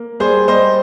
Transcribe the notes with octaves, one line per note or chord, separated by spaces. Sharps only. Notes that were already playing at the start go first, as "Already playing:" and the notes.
Already playing: A#3
G3 G#4 C5
G3 C5 D#5